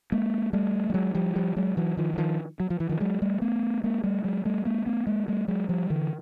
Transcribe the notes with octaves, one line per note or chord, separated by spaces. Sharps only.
G#3 A#3
G3 A3
G3
F#3 G#3
F3 G3
F3 G3
F#3 G#3
E3 F#3
D#3 F3
E3
D#3 F3
F#3
F3
E3
D#3 F3
F#3 G#3
G3 A3
A3 B3
G#3 A#3
G3 A3
F#3 G#3
G3 A3
G#3 A#3
A3 B3
G#3 A#3
G3 A3
F#3 G#3
F3 G3
D3 E3